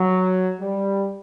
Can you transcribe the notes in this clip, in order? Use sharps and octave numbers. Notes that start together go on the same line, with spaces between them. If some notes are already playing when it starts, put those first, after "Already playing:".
Already playing: F#3
G3